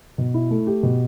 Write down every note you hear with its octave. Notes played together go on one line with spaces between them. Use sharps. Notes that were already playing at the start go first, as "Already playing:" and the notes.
B2
E4
A3
G4
B2